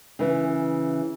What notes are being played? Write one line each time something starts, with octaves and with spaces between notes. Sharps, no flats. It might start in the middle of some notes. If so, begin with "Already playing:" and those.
C#3 E3